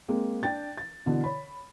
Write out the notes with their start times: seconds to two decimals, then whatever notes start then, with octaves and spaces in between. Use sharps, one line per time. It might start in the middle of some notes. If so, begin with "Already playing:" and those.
0.08 G#3 A#3 C4
0.43 D4 G5 A6
0.77 A6
1.06 B2 D3 E3
1.24 C#5 B5